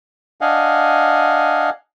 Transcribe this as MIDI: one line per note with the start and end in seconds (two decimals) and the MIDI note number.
0.41 1.70 62
0.41 1.70 75
0.41 1.70 77
0.41 1.70 78
0.41 1.70 80